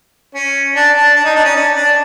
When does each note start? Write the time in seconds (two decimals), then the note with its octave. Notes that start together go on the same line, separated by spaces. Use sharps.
0.35 C#4
0.75 D4
0.95 D4
1.16 D4
1.25 D#4
1.35 D4
1.45 C#4
1.55 D4
1.75 D4